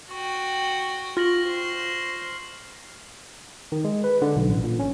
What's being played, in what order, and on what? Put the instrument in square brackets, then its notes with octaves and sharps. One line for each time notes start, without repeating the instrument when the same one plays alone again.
[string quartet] F#4 G5 [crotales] C#6
[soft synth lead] F4 [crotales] F6 A#6 F#7
[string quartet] C5
[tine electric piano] D#3
G#3
B4
D3
B1
A1
A#2
C#4